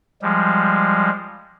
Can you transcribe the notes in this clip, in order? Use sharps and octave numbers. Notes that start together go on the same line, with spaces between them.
F3 G3 G#3